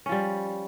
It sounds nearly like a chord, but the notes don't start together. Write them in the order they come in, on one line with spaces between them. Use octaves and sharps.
C#4 F3 G3